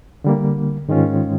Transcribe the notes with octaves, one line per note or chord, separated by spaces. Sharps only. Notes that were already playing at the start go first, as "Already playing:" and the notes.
D3 G3 A#3
G#2 D#3 G#3 C#4 F4